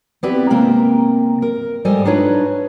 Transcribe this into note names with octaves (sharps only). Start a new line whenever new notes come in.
B3 C4 E4 G4 B4 D5
C3 G#3 A#3 A#4 G5
A#4
G#2 G3 A4 C5 D#5 G#5
D4 D#4 F4 B4 C#5